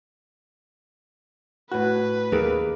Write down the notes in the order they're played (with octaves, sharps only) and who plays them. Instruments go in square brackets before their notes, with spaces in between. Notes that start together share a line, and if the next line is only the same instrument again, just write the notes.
[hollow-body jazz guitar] A2 F#4 [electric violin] B4
[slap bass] D#2 [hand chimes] G#4 A#4